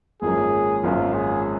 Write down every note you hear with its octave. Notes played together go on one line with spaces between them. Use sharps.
G#1 F#2 F3 A#3 C#4 G#4
G#1 F#2 F3 A#3 C#4 F4
G#4